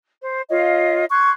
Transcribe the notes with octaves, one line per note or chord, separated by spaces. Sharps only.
C5
F4 C#5 D#5 F5
C6 C#6 F#6 G#6